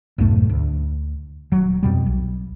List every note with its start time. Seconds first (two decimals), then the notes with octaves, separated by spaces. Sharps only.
0.18 B1 F2 G#2 A3
0.49 D2
1.52 D#1 F#3
1.83 F2 B2 G3
2.06 B1